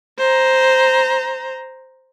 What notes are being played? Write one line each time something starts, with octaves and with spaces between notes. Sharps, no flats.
C5 A#5